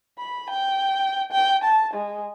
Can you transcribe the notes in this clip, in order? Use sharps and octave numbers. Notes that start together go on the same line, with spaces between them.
B5
G5
G5
A5
G#3